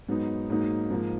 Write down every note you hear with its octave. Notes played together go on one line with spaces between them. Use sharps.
G#2 F#3 B3 D#4
G#2 F#3 A#3 D#4
G#2 F3 A#3